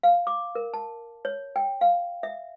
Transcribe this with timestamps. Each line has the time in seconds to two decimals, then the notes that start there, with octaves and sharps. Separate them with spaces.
0.03 F5
0.27 D6
0.55 A#4
0.74 A5
1.25 C#5
1.56 G5
1.81 F5
2.23 E5